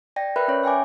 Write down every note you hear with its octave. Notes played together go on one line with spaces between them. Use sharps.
D5 G5 A#6
A#4 B4 D5 E5 B5 F#6
C#4 C#5
E5 G5 G#5 D6